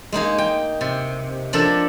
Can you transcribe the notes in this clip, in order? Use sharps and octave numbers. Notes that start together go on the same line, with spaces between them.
G#3 A#3 D#4 G#4
G5
C3
F3 A#3 D4 A4